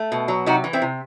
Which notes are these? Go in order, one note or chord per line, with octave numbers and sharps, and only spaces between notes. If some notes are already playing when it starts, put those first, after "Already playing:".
Already playing: A3
B2
F#3
C3 D#4 F#4
E3
C4 E4
C3